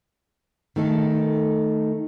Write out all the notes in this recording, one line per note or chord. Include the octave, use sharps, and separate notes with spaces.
D#3 A3 D#4 A4